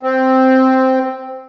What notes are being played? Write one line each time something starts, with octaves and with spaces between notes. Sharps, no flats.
C4